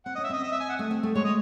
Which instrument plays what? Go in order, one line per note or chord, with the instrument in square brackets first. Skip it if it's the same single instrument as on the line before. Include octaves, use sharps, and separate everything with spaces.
[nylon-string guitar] C4 [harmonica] F#5
[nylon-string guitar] C#4 [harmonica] D#5
[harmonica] E5
[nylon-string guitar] C4 [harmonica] D#5
[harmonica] D#5
E5
G#5
F#5
[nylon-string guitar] A3
C4
A3
[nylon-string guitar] G#3 [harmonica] C#5
[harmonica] D#5